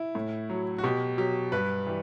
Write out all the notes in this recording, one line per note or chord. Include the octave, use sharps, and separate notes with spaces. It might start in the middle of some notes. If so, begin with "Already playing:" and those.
Already playing: E4
A2
F#3
F#4
B2 G4
F#3 G4
G2 B4
E3 G3